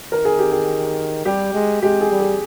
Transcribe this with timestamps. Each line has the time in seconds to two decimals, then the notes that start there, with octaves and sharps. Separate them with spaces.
0.11 D#3 A#4
0.25 G#4
0.39 G4
0.52 G#4
1.25 G3 G4
1.54 G#3
1.82 G#3 G4
2.01 G#4
2.11 G3
2.20 G#4